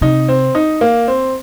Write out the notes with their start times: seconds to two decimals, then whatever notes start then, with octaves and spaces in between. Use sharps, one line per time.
0.01 C3 D#4
0.28 C4
0.55 D#4
0.81 A#3
1.08 C4